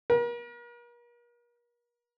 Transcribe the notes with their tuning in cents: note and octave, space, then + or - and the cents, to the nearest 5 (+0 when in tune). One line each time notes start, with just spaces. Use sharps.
A#4 +40